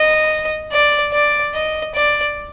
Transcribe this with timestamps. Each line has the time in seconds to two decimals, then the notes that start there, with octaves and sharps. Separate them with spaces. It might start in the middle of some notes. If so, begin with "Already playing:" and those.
Already playing: D#5
0.72 D5
1.13 D5
1.55 D#5
1.95 D5